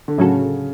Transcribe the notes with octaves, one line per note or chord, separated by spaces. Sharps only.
D3
A2 C#3 F#3 C#4 F#4 A4